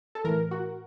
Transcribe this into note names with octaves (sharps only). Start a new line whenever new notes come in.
A4
A2 E3 A#4
F#4